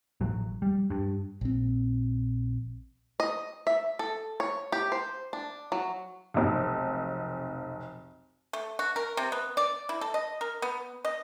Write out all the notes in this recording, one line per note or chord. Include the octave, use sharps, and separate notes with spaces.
A1 F#3
G3
G2
A#1 C4
D#5
E5
A4
C#5
G4
C5
D4
F#3
F1 B1
A3
F#4
A#4
C3
B3
D5
E4
A4
D#5
A#4
B3
D#5